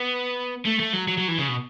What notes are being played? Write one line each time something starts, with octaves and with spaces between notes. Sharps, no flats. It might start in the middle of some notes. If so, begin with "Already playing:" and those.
Already playing: B3
A3
A3
F#3
F#3
F#3
E3
C#3
B2